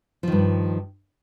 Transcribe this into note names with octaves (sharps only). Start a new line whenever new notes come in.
G2 D#3 F3